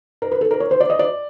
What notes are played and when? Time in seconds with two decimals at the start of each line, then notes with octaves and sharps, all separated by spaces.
0.22 A#4
0.32 B4
0.41 A4
0.51 A#4
0.60 C#5
0.71 C5
0.80 D5
0.90 D#5
0.99 D5